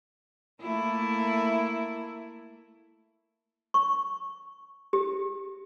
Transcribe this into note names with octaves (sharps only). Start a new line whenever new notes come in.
A3 A#3 E4
C#6
G4